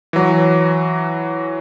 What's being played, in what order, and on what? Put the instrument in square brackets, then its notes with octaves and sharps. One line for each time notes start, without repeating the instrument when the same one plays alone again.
[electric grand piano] E3 F#3